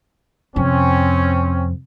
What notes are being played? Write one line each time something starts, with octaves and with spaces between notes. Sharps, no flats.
F2 C3 C4 C#4